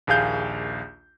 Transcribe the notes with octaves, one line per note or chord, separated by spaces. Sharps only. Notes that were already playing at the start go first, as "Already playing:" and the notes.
A#1 D#2 G#4 F5 G6